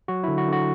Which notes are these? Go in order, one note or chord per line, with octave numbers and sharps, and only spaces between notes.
F#3 F#4
D3 E4
F#4
D3 F#4